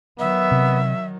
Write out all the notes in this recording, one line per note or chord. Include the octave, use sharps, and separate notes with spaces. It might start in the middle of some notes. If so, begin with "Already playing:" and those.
D#3 F#3 B3 E5
C3